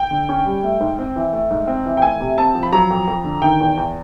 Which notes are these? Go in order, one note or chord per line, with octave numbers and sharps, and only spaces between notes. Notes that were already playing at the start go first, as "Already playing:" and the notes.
Already playing: G5
D3
C#4
G3
A3
G#2
C4
E3
A3
G#2
C4
E3
G5
A3 G#5
C3
C4 A5
F3
B5
F#3 A#5
F2
F2
D3
D#3 G5
E2
E2